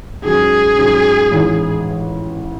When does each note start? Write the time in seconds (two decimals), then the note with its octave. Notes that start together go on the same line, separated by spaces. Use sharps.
0.24 G#2 F#3 C#4 G#4
0.78 G#2 F#3 C#4
1.31 A1 G#2 E3